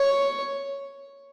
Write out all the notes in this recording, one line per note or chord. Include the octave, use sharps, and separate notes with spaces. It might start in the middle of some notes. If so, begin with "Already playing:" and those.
Already playing: C#5